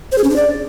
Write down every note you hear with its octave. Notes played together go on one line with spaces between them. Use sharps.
C5
G#4
C#4
D4
D5